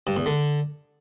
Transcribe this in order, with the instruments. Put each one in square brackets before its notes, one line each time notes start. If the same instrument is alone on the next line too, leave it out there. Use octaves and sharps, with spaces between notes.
[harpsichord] G2
E2
D3